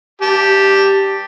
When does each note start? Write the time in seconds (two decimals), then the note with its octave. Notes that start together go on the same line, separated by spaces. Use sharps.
0.22 G4 A5